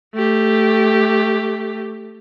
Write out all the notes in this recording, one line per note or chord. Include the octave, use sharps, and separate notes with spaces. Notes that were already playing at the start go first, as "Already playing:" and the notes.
A3 G4